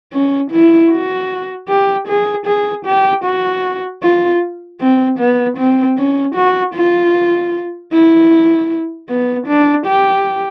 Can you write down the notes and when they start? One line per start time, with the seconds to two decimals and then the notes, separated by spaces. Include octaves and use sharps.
0.13 C#4
0.52 E4
0.91 F#4
1.69 G4
2.08 G#4
2.47 G#4
2.86 G4
3.25 F#4
4.03 F4
4.81 C4
5.19 B3
5.58 C4
5.98 C#4
6.36 F#4
6.75 F4
7.92 E4
9.10 B3
9.48 D4
9.87 G4